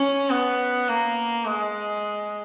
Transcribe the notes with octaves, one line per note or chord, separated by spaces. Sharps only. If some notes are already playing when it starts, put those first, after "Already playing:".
Already playing: C#4
B3
A#3
G#3